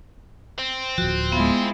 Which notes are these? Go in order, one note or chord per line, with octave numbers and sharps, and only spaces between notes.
C4
D1 F3 F#4
G#3 B3 E4 F4